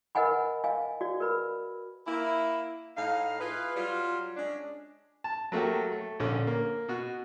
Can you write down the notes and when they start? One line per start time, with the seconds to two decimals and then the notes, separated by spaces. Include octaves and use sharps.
0.15 A#4 B4 D#5 F#5 G#5 B5
0.64 D#5 F5 G#5
1.01 F#4 D5
1.20 A#4 B4 B5
2.07 A#3 E4
2.97 A2 D#4 F5
3.40 E4 F4 G#4 B4
3.76 F#3 G3 F4
4.36 G#3 C#4 D4
5.24 A5
5.52 F#3 A3 A#3 F#4 G4
5.92 A3
6.20 A#1 D3 C#4
6.47 A#3
6.88 B2 F#4